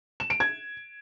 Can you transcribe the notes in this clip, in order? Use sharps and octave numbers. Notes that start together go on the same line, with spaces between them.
E7
D7
G#6